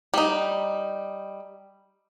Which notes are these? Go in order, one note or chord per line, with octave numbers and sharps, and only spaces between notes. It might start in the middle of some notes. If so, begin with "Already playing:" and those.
G3 D#4